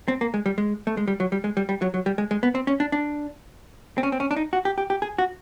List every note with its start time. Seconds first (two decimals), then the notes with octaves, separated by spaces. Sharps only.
0.08 C4
0.21 A#3
0.34 G#3
0.46 G3
0.58 G#3
0.87 A3
0.97 G#3
1.08 G3
1.20 F#3
1.32 G3
1.44 G#3
1.57 G3
1.69 G3
1.82 F#3
1.94 F#3
2.06 G3
2.18 G#3
2.31 G#3
2.43 B3
2.55 C4
2.67 C#4
2.80 D4
2.92 D4
3.98 C4
4.03 C#4
4.12 C4
4.20 C#4
4.31 D4
4.36 D#4
4.53 F#4
4.65 G4
4.78 G4
4.90 G4
5.02 G#4
5.18 F#4